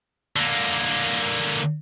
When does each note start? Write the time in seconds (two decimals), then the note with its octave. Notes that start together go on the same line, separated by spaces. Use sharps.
0.36 D3 A#3